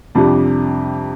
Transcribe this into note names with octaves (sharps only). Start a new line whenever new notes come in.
F2 C3 G3 D4